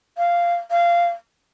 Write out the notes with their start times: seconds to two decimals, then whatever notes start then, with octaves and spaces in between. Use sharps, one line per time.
0.18 F5
0.71 F5